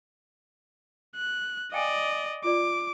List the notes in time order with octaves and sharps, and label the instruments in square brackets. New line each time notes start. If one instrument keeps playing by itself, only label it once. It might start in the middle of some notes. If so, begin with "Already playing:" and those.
[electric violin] F#6
[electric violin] D5 D#5 [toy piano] F5 G5 G#5
[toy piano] F4 D5 [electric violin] D6